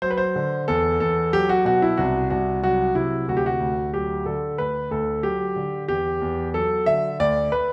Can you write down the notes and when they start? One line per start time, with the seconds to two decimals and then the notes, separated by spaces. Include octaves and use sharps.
0.02 F#3 C5
0.11 B4
0.17 C5
0.36 D3
0.68 E2 A4
1.00 E2 A4
1.33 F#3 G4
1.49 F#4
1.65 B2 F#4
1.82 E4
1.97 C2 F#4
2.30 C2 F#4
2.63 F#3 F#4
2.95 C3 E4
3.28 D2 F#4
3.37 G4
3.46 F#4
3.60 D2
3.94 F#3 G4
4.26 D3 A4
4.58 D2 B4
4.91 D2 A4
5.23 F#3 G4
5.56 D3
5.88 E2 G4
6.22 E2
6.54 F#3 A4
6.86 D3 E5
7.20 D2 D5
7.52 B4